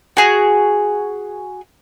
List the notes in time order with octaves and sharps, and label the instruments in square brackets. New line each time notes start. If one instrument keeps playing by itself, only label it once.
[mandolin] F#4 G#4